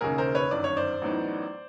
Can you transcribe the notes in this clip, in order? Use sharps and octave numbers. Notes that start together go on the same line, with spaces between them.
E1 D#2 C#3 G#4 A#4
A#4 C5
B4 C#5
G1 F#2 D#3 D5
C#5
C5 D5
A1 A2 F#3 B3 D#4